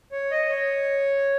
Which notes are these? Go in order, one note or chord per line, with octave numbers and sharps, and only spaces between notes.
C#5
D#5
C#5